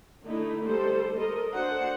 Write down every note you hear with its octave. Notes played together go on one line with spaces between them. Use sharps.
D3 A3 D#4 E4
G3 A4 C5
A4 A#4 D#5
D4 F#4 C5 F#5